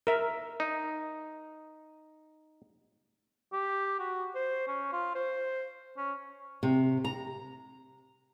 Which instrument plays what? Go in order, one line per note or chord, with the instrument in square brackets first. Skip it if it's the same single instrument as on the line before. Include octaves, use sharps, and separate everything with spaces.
[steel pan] A#4 E5
[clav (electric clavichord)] D#4
[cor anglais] G4
F#4
C5
C#4
F4
C5
C#4
[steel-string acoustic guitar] C3
A#5